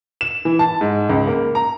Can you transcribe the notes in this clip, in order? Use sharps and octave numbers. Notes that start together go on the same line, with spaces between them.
E7
E3
A5
G#2
C#2
A#3
A#5